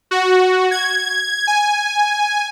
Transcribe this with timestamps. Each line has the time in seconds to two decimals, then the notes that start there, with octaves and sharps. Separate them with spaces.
0.11 F#4
0.71 G#6
1.47 G#5